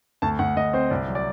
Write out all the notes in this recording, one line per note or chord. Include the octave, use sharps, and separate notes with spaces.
D2 A5
D2 F#5
D2 D#5
C4 C5
C2 D5
F#3
D5